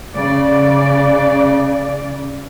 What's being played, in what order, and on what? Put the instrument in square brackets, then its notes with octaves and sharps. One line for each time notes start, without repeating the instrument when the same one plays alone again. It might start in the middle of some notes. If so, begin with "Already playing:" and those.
[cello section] C#3 D5